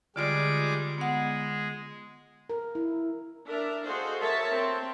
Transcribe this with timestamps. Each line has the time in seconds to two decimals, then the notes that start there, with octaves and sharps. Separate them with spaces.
0.16 D3 G3 G#3 F4 D5 D6
0.98 G#3 B3 F#5
2.50 A#4
2.75 E4
3.47 D4 A#4 E5
3.85 F#4 G#4 A4 C5 D#5 F5
4.20 A#4 C#5 E5 A5
4.50 C4